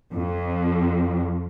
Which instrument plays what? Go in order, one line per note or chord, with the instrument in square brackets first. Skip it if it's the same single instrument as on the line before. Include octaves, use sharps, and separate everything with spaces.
[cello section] F2